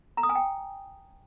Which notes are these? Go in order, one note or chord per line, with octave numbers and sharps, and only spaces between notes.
A#5
D#6
G#5
G5